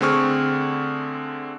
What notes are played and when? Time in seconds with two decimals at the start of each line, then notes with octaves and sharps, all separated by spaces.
0.01 D3 A3 C4 G#4 C#6 F6